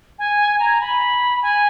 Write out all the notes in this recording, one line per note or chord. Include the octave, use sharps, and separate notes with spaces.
G#5
A#5
B5
G#5